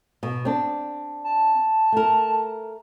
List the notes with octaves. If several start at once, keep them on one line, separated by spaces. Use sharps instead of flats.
B2
C4 D4
A5
A3 A#4